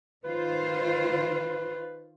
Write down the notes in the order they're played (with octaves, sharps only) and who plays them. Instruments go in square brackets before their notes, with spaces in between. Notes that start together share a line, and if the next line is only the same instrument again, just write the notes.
[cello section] D#3 F4 C5 [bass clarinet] B4